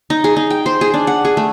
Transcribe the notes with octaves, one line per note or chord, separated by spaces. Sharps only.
D#4
G#4
D#4
G5
C5
G#4
D4
F#5
G#4
A3